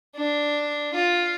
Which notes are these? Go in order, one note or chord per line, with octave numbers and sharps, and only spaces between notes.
D4
F4